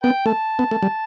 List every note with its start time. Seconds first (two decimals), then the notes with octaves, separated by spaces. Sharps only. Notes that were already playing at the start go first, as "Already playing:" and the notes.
0.03 B3 B4 G5
0.26 A3 A5
0.59 B3
0.71 A3
0.83 G3